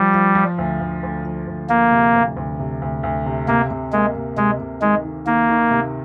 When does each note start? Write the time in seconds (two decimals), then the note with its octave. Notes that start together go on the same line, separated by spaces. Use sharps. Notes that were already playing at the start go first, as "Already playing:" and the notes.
Already playing: F3 G3
0.14 F3
0.35 F3
0.58 D2
0.80 D2
1.03 D2
1.25 F3
1.47 D2
1.69 F3 A#3
1.92 C3
2.15 D2
2.37 D2
2.59 C3
2.82 D2
3.03 D2
3.26 C3
3.48 C3 A#3
3.71 C3
3.93 G#3 A#3
4.15 C3
4.37 C3 G#3
4.60 C3
4.82 D#3 G#3
5.05 D#3
5.27 D#3 A#3
5.50 D#3
5.71 C3